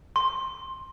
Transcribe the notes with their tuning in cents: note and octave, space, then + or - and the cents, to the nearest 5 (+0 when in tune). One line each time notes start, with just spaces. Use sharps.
C6 +15